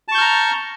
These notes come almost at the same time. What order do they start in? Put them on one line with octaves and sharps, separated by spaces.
A5 C#6 G6 F6 A#5